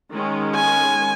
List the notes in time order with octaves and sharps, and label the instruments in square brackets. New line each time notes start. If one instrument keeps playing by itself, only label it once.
[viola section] D#3 G#3 C#4
[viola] G#5